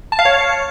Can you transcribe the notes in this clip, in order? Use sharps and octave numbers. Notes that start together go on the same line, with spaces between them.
A5
F5
C#5